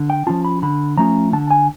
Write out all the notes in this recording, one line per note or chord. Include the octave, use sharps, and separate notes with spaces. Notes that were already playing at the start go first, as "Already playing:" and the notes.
Already playing: D3
G5
F3 A3 C#4 F4 A5
B5
D3 B5
F3 A3 C#4 F4 A#5
D3 A5
G#5